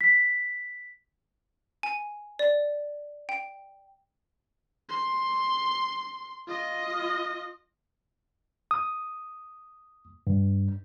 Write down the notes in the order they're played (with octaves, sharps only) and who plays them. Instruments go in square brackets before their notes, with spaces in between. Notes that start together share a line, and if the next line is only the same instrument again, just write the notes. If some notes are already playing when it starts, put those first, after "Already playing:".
[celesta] B6
[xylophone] G#5
D5
G5
[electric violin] C6
F4 D#5
[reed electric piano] D#6
G2